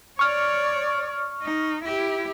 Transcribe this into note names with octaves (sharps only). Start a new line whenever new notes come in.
C#5 D5 C#6 F6
D#4
E4 G4